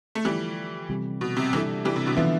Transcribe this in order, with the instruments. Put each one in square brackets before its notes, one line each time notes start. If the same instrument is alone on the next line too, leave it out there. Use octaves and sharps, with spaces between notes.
[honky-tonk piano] A3
[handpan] D3 F3 B3 F4 A4 [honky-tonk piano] E3 G3
[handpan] C3 E3 G3 C4 G4
[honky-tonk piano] B2
C3
[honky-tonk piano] C3 E3 [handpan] G3 D4 A4
[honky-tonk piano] E3 G3
C3
B2 D3
[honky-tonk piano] D3 F3 [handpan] E3 B3 E4 B4 E5